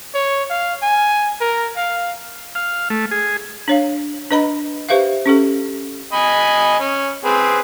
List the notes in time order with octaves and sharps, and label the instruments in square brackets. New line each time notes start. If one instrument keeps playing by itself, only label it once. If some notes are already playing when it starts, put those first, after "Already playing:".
[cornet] C#5
F5
G#5
A#4
F5
[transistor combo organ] F5
A3
G#4
[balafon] D4 C#5 F5
D4 B4 D#5 A#5 B5
G4 B4 C5 E5 F5
C#4 G4 A4
[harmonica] D#5 G#5 B5
C#4
C4 G#4 B4